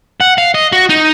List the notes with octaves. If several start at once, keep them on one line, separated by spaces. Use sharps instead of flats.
F#5
F5
D#5
F#4
D#4